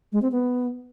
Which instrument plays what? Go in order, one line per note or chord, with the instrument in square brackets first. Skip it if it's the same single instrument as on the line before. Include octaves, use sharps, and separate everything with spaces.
[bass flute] G#3
C4
B3